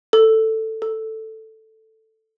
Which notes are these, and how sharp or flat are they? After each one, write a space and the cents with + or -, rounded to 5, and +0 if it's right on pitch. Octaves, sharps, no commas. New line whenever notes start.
A4 +10
A4 +5